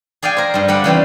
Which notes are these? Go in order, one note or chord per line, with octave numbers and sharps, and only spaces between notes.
G#4 D5 F5 G5 G#5
A#4 C5
G2 G3
D3 G3 D4 F5 F#5 B5
C#3 E3 G3 C4